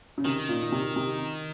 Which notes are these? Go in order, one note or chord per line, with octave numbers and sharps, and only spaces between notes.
C#3
C3 D#3
A#2
A#2
C3
C3